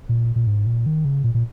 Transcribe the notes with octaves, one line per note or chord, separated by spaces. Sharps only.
A#2
A#2
G#2
A#2
D#3
C#3
A#2
A#2